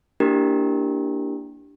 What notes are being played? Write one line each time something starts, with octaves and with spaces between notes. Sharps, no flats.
A#3 D4 E4 G4 A#4